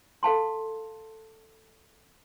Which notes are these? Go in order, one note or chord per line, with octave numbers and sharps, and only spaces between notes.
A4 F5 A5 C6